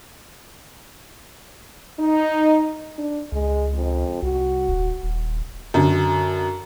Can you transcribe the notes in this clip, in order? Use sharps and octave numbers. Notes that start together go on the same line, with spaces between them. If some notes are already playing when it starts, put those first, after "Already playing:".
D#4
D4
C#2 G#3
F2
C2 F#4
D#1
D#1
F#2 D3